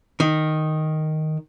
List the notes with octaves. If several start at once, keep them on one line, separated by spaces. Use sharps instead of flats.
D#3